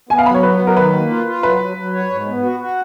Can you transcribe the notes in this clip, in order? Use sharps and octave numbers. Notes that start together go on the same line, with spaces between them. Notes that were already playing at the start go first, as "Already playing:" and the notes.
B3 G#5
F5
F#3 B5
C#5
B3 B4
F#3
A#4
D#3 B4
A#3
F4
F4
F#3 B4
F#3
F#3
C#5
G#2
B3
F#4
F#4